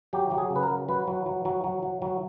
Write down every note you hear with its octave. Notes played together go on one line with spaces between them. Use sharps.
F#3 G4
F#3 G4
G#4
C#3
B4
A#4
F#3
F#3 B4
F#3
F#3
F#3
F#3
F#3
F#3